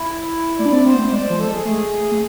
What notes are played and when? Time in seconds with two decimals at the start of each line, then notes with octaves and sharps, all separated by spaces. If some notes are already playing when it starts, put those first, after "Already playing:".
Already playing: E4
0.59 A3 D5
0.66 D4
0.72 C4
0.85 C4 C5
0.93 B3
0.99 A3
1.12 G#3 D5
1.25 F3 C5
1.39 A4
1.47 G#3
1.52 G#4
1.65 A3
2.11 A3